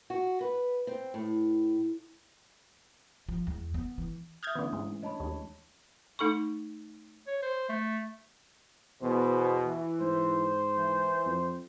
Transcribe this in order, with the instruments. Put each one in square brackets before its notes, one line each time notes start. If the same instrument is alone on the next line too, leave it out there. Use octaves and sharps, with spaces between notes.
[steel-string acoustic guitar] F#4
B4
C4
A2
[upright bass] F3
E2
B3
E3
[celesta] E5 D#6 [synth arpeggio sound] F6 G6 G#6
[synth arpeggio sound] D3 B3 [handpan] E3 A3 C#4
[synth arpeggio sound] G#2
[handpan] G#3 D4 C#5 [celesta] D#5 A5 B5
[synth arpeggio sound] D#2
[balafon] A3 D#4 A4 B5 C#6
[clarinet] C#5
C5
A3
[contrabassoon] E2 [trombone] B2 [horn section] G#4 B4 C5
[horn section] E3
[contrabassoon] G#2 [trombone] C5
[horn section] E3
[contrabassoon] F2